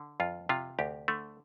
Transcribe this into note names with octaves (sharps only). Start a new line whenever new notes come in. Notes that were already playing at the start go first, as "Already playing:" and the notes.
Already playing: D3
F2 F4
C3 F4
D2 G4
D3 A3